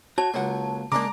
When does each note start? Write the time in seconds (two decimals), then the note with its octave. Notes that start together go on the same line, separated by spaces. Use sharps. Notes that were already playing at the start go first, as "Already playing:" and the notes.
0.18 F#4 C#5 A5
0.34 C#2 F#3 A#3 F#5
0.92 C#3 G#3 A#3 D4 A#5 D6